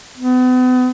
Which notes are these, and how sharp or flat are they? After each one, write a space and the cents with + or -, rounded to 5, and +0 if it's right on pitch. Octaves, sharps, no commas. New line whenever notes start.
B3 +40